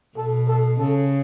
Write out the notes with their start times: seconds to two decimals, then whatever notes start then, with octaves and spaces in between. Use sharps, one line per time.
0.17 B2 A4
0.48 A4
0.80 C#3 A4